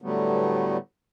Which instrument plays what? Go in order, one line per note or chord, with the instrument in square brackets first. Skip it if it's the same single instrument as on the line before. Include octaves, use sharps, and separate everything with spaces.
[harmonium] A2 D3 F#3 G3 A3 B3